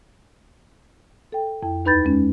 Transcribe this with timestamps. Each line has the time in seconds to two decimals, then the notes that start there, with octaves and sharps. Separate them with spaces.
1.32 A4 G5
1.63 F2 E4 G5
1.85 D#2 D#4 B4 B5 G6 A6
2.05 G#3 C#4